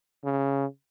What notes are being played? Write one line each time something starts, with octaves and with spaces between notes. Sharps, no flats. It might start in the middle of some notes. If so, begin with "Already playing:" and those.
C#3